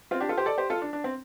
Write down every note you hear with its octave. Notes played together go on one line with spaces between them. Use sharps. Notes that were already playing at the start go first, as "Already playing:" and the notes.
C4 F4
D4 G4
F4 A4
G4 C5
A4 D5
G4 C5
F4 A4
D4
D4
C4